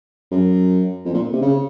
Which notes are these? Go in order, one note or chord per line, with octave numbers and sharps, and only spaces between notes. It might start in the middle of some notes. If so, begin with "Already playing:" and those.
F#2
F2
A#2
C3
C#3